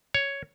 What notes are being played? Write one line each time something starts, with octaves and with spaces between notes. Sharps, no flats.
C#5